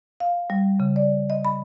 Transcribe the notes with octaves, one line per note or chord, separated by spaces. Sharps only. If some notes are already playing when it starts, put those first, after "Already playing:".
F5
G3
C#3
D5
D#5
B5